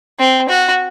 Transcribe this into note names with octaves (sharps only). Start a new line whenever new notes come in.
C4
F#4